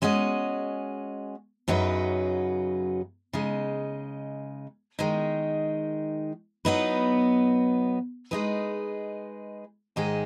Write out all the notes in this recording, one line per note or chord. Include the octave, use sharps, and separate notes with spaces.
G#3 C#4 F#4 D#5
F#2 C#3 F#3 D#4 B4
C#3 G#3 D#4
D#3 G#3 D#4
F#3 B3 D#4 B4
G#3 D#4 G#4 B4
G#2 D#3 G#3 D#4 G#4